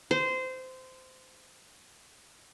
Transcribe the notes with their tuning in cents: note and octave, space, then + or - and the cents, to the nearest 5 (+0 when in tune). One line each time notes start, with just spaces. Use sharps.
C5 -20